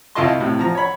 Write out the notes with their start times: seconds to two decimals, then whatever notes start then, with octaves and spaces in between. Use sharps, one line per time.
0.15 C2 E4 F4 D#5 A5 C6
0.40 A2 C3
0.59 F3 A#5
0.75 C#5 B5